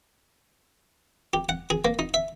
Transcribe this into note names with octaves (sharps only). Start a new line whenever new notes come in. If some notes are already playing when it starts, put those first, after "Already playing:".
G4
F#5
G#4
A#3
D#4
E5